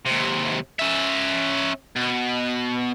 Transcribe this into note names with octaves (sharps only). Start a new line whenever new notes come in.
D#2 C3
C#4 E5
B2